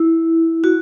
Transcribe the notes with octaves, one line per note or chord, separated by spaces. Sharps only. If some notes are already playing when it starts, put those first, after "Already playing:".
Already playing: E4
F#4